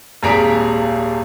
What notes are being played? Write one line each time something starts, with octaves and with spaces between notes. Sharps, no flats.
D#1 G#1 G#4 A#5 B6 D7